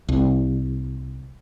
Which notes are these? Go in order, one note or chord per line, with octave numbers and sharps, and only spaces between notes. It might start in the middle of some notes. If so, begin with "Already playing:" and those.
C2